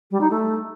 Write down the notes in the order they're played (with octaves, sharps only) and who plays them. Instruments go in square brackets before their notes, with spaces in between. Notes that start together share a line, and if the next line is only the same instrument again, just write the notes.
[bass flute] G3
D#4
A3